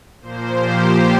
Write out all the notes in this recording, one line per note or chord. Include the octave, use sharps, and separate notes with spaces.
A#2 F3 A#3 C5
G4